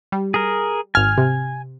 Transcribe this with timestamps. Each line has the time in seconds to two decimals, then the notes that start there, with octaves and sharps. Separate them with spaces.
0.12 G3
0.34 G#4 A#4
0.95 G#1 G#5 F6
1.18 C3